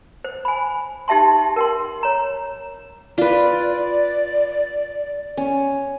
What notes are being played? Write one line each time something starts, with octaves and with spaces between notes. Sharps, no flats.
C5
G#5 B5
D#4 G4 E5 A5 C6
A#4 G5 C6
C#5 A#5
F4 B4 D5
C#4